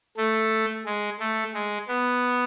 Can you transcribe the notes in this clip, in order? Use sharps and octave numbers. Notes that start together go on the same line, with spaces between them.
A3
G#3
A3
G#3
B3